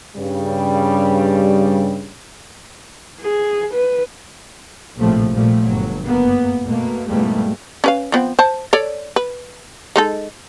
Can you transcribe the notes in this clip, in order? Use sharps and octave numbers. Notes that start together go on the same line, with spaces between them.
G2 C#3 G3
G#4
B4
A#1 A2 C3 F3 A3
A#2 F3 G3 A3
G1 F#3
F#1 A#3 B3
B2 A3 A#3
E2 G#2 B2 G3 A3 A#3
C#4 B4 F5
F3 B3 C4
C5 A5
A4 C#5 D5
B4
G#3 D#4 A4